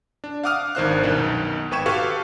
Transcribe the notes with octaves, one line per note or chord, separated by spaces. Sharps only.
D4
F5 F#5 D6 D#6 F6
G#1 D#3 D4 C5 F5 F#6
C2 F#2 B2 D#3
G#1 B4 G5 C#6 G#6 E7
F#4 G4 A4 B4 F5 C#6